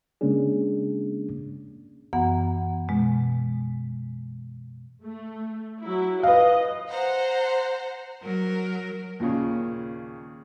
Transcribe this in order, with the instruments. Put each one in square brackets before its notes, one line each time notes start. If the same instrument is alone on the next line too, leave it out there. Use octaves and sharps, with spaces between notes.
[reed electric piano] C#3 G#3 A#3 C#4 D4 G#4
[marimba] F#2 E3 B3 F#5 A#5
B2 G#3
[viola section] A3
F#3 E4
[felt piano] B4 F5 [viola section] D#5
[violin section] C5 F#5 A#5
[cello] F#3 A#4
[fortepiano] D#2 A#2 C#3